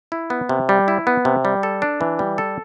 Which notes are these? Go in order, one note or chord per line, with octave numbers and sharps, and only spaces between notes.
E4
B3
C3
G3
E4
B3
C3
G3
A4
D4
E3
G3
A4